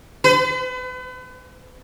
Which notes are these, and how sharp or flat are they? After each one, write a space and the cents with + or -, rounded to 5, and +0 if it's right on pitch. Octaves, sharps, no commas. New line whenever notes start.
B4 +40